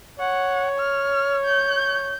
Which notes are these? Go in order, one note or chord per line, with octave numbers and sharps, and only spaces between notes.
C#5 F#5
F6
G6